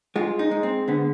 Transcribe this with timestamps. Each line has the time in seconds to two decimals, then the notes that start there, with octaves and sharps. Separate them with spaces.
0.16 G#3 F4
0.39 D#4
0.51 G#3
0.63 C4
0.88 D3 B3